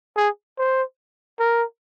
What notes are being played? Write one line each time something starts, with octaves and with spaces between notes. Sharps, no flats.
G#4
C5
A#4